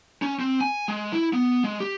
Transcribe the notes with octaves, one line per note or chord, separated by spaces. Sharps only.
C#4
C4
G#5
G#3
E4
B3
G#3
G4